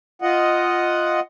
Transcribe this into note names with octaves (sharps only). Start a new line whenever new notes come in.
F4 D#5 F#5